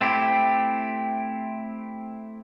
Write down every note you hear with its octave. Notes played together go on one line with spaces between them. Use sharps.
A3 C4 E4 G4